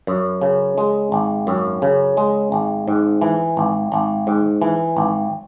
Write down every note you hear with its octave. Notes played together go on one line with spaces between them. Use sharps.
F#2
C#3
G#3
G#1
F#2
C#3
G#3
G#1
G#2
E3
G#1
G#1
G#2
E3
G#1